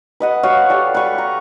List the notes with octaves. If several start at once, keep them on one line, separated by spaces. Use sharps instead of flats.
B4 D#5 F#5
F#4 C#5 F5
G4 A4 D5
B4 C#6
A#5